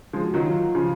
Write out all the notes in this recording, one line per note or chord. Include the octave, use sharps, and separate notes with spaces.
F3 G#3
F#4
D#3 F#3 F4
C#3 F3